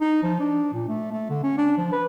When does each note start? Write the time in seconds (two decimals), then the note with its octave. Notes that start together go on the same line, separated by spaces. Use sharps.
0.01 D#4
0.23 F3
0.40 D4
0.73 A#2
0.88 A3
1.12 A3
1.30 D3
1.43 C#4
1.58 D4
1.78 F3
1.92 B4